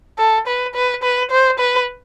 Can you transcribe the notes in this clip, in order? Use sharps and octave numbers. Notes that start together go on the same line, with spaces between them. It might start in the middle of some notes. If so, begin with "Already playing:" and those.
A4
B4
B4
B4
C5
B4